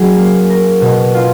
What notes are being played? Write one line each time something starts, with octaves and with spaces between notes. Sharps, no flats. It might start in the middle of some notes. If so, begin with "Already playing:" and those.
Already playing: F#3 C#4 G#4
A#3
A#4
B2
F4